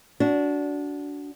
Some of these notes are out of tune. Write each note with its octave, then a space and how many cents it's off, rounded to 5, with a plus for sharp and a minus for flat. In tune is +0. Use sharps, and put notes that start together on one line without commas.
D4 -20 F#4 +0